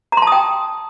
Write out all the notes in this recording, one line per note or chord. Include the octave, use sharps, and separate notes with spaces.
G5 A5 A#5 C6 D#6